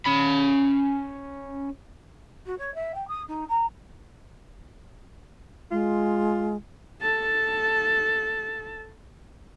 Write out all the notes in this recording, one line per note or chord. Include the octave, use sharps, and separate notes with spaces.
C#4 B5
F#4
C#5
E5
G5
D#6
D#4
A#5
G#3 F4
A4 A5